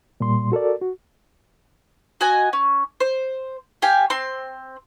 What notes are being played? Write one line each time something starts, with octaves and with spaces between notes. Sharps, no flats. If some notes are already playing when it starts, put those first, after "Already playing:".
A#2 G3 C6
F#4 A4 A#4 D5
F#4
F#4 D#5 G#5
C#4
C5
G4 F5 G#5
C4 C6